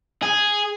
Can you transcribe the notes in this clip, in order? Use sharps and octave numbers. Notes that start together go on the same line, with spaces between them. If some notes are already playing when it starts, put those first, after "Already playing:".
G#4